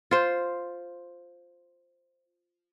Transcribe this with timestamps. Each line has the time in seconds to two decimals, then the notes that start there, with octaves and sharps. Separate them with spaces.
0.11 F4 C5